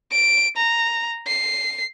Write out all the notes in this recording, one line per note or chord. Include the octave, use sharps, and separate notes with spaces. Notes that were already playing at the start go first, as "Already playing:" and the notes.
D7
A#5
C7